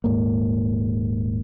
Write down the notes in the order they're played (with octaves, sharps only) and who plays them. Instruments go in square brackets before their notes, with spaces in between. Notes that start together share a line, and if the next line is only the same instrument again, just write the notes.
[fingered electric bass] D#1 G#2 A#3